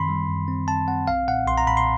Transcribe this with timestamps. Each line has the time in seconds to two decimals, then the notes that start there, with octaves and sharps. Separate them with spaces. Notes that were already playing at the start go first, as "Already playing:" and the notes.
Already playing: F#2 D#3 C4 B5 C6
0.09 G3
0.28 F#2
0.48 C4
0.68 C4 A5
0.88 C4 F#5
1.08 B1 F5
1.28 A#2 F#5
1.47 B1 C6
1.58 A#5
1.67 A#2 B5
1.77 C6